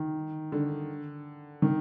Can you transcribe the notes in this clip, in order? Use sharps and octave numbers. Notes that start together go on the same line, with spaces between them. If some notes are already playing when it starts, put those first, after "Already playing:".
Already playing: D#3
D3
D#3